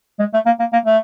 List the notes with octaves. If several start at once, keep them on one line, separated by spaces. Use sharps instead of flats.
G#3
A3
A#3
A#3
A#3
A3